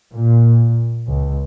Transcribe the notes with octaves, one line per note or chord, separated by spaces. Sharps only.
A#2
C#2